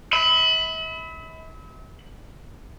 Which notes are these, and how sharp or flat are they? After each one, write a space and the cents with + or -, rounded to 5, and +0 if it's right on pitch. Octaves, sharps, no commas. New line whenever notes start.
E5 -40 B5 +15